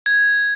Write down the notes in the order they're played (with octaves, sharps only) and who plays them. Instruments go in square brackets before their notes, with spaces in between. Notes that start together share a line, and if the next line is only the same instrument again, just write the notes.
[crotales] G#6